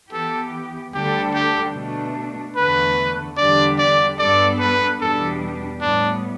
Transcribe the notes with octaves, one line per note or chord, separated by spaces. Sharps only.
E3 B3 G4 A4
D2 D3 G3 D4 G4 A4
G4
B2 A3 D4
E2 D3 A3 B4
E2 D3 G3 D4 G4 D5
D5
G2 G3 B3 D4 A4 D5
B4
E2 B2 G3 D4 G4 A4
A2 G3 B3 D4